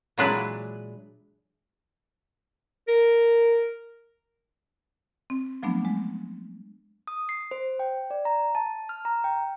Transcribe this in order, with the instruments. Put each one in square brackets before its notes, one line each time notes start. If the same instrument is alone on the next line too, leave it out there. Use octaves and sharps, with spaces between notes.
[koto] A#2 E3 F#3 G#3 D4 B4
[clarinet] A#4
[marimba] C4
F3 F#3 A3 B3 D4
G#3
[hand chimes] D#6
C7
C5
G5
D5
A#5
A5
F6
A#5
G5